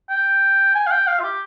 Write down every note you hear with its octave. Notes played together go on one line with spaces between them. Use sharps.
G5
G#5
F5
G5
F5
F4
G4